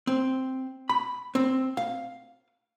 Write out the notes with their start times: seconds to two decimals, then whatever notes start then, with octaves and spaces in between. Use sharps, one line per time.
0.07 C4
0.89 B5
1.35 C4
1.77 F5